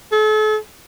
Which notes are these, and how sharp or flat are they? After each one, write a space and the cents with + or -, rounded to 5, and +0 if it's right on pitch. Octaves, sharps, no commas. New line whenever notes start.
A4 -40